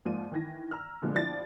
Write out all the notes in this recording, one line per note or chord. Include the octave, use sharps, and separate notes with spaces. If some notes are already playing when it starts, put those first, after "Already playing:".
G#2 F3 A#3 F4 D5 D#7
D#3 E3 G#6 A#6
A#5 E6 F6
A#2 D3 F3 G#3 B3
F3 D4 E4 G4 D5 A6